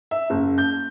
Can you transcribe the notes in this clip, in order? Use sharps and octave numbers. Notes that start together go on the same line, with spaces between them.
E5
F#1
G6